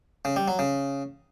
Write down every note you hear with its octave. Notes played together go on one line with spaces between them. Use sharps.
C#3
G3
F#3
C#3